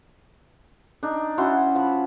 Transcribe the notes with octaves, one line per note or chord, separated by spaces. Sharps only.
D4 D#4
C#4 E4 F#4 C6
F3 B5